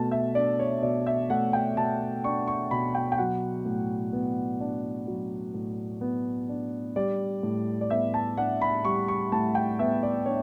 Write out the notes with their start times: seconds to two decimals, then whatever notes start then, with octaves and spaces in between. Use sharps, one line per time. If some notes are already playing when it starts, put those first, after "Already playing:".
Already playing: B2 A3 A5
0.11 E5
0.35 D4 D5
0.59 C#5
0.82 B2 D5
1.06 E5
1.30 A3 F#5
1.53 G5
1.76 B2 A5
2.24 D4 C#6
2.47 C#6
2.71 B2 B5
2.95 G5
3.12 G5
3.18 F#3 F#5
3.65 A2
4.13 B3
4.60 D4
5.07 F#3
5.54 A2
6.01 B3
6.49 D4
6.96 G3 D5
7.43 A2
7.81 D5
7.90 B3 E5
8.14 A5
8.37 D4 F#5
8.62 B5
8.85 G3 C#6
9.08 C#6
9.32 A2 A5
9.55 G5
9.79 B3 E5
10.03 D5
10.26 D4 C#5